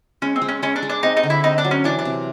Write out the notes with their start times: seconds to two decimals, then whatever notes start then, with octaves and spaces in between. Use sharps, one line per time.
0.22 G#3 C#4
0.36 C4
0.42 G#3
0.48 C#4
0.62 G#3 C#4
0.76 D4
0.82 G#3
0.89 D4
1.03 C4 D#4
1.17 D#4
1.23 D3
1.30 E4
1.44 C4 D#4
1.58 D4
1.65 F#3
1.71 C#4
1.84 E3 D4
1.99 D4
2.05 C3